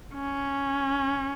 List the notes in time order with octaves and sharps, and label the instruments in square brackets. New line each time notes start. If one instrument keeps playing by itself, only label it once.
[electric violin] C#4